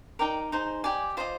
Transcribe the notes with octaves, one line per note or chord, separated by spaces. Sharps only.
D#4 A#4 D5 G5
D#4 G#4 C5
G4 D5 G#5
F4 C5 D#5